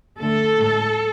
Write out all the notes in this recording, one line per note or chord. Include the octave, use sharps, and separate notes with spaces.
D3 A3 A4
A2 G#3